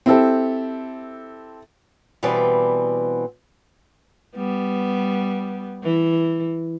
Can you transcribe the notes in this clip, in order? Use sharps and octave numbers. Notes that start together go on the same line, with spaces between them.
C4 E4 G4 A4
B2 E3 G3 B3 C4 D5
G3 B3
E3